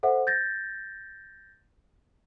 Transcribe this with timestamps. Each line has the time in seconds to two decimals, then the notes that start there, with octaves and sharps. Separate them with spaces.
0.03 A4 C5 E5 F#5
0.27 G6 A6 A#6